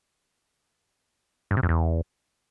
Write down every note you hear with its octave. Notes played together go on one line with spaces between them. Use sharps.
G2
C3
F2
E2